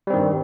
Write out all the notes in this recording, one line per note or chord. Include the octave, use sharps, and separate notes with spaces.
G2 D#3 G3 C4